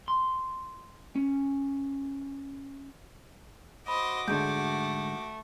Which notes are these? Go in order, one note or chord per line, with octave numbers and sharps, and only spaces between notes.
C6
C#4
F#4 C5 D#5 B5 D6
G#2 D3 A3 G6 D7